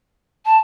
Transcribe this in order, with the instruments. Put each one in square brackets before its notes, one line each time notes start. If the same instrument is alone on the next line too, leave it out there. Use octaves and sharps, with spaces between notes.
[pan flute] A5